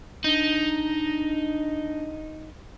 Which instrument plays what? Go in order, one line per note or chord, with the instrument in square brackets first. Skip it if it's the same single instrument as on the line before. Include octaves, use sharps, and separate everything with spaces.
[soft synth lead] D4 [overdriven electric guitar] D#4